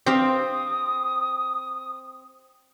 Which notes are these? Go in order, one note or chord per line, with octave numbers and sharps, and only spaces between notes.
C4 G4 C5 F5 D#6